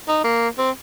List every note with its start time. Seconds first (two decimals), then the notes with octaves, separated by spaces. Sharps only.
0.08 D#4
0.24 A#3
0.58 C4